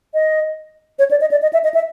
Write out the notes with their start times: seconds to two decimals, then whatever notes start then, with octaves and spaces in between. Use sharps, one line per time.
0.14 D#5
0.99 C#5
1.11 D5
1.21 D#5
1.31 D5
1.42 D#5
1.53 E5
1.64 D#5
1.74 E5